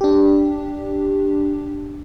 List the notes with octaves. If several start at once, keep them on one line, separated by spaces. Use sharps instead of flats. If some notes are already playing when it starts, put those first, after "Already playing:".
D4 G4